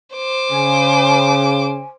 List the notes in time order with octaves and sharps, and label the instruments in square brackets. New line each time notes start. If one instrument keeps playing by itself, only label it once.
[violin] C5 D6
[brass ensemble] C#3 [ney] G#5